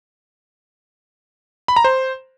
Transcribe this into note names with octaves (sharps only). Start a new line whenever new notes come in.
B5
A#5
C5